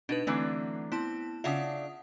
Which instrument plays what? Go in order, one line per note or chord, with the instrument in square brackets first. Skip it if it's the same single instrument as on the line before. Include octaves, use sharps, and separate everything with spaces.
[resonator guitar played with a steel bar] B2 [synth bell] D4 D#4 B4
[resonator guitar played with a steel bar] D3 E3 F#3 [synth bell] A3 C4
[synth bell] B3 E4 A5 [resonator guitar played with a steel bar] C4
[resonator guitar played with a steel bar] C#3 D4 E5 [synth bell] F4 F#5 D#6